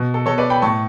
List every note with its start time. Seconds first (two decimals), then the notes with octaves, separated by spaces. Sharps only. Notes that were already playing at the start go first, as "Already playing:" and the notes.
Already playing: B2
0.14 A4
0.26 B2 A4 C#5
0.38 B4 D5
0.50 G5 B5
0.62 A2 A5 C#6